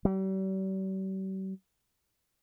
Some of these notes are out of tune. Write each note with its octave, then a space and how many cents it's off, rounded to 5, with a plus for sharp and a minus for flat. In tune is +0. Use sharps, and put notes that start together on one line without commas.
G3 -45